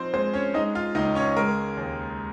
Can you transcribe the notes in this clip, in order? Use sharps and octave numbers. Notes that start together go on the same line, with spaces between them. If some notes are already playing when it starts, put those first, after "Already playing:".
Already playing: F3 C4 D#4 C5
G#3 C4 C5
C#4 C#5
G#3 D#4 D#5
F4 F5
C#2 D#4 D#5
C#4 C#5
G#3 A#4
D#2